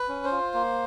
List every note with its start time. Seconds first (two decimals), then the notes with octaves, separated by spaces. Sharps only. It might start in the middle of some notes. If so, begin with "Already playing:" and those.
Already playing: B4
0.09 C#4
0.24 C5
0.32 F4
0.54 A#3